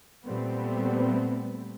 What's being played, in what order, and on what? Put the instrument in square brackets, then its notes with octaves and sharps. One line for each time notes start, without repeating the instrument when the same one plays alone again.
[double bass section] A#2 G3 A3 B3 C4